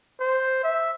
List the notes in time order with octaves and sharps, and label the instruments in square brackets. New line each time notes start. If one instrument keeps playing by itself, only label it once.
[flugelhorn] C5
E5